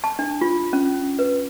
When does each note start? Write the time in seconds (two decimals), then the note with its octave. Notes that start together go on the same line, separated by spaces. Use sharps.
0.04 A5
0.19 D4
0.41 F4
0.73 C#4
1.19 B4